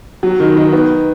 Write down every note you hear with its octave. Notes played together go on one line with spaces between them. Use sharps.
F#3
D#3
D#3
B3